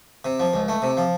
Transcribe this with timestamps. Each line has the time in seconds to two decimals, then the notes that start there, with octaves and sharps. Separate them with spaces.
0.25 C3
0.40 F3
0.53 C#2
0.68 A3
0.82 C3
0.97 F3